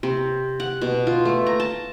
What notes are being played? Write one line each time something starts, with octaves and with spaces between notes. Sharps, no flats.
C3
F#5
B2
F4
A3
A#5
A5